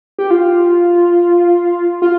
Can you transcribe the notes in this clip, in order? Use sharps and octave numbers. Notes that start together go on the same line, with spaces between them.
G4
F4
F4